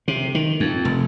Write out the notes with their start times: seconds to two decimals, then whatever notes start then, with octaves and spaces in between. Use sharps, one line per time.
0.08 C3
0.35 D#3
0.60 F2
0.85 F1